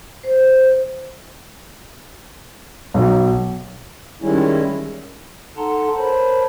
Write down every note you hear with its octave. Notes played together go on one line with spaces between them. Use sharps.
C5
B1
D#3 G3 G#3 C#4 E4
D#4 A4 F#5 A5 A#5 C6
A#4 C5 C#5 A5 B5